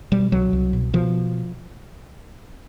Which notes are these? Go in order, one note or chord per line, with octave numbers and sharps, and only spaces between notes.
B2 G3
C2 F#3
C2
B2
B2 F3